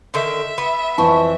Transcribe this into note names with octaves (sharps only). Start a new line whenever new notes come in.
D3 D#3 E5
B3
F2 E3 E4 A5 C#6